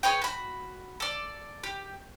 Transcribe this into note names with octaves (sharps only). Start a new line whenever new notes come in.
G#4 B4 C#5 G5
F#4 B5
A4 D5
G4